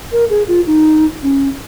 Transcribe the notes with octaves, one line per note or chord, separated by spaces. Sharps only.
A#4
G#4
F4
D#4
C#4